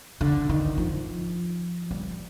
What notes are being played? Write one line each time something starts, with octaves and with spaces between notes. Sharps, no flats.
D3
D#3
F3
G3